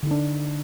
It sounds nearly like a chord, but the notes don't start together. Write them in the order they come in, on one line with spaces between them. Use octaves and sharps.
D3 D#4 D4